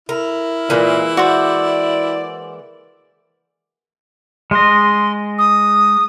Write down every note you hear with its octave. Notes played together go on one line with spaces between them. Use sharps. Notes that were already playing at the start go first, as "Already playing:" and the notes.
E4 A#4
A#2 E3 G#3 A#3
F#4 C5 D5
G#3 D#5 C6
D#6